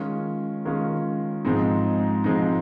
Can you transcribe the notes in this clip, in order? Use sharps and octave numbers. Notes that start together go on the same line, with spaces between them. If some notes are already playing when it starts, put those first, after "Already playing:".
Already playing: D#3 G#3 C#4 F4
D#3 G#3 C#4 F4
G#2 F3 G#3 C4 D#4
G#2 F3 G#3 C4 D#4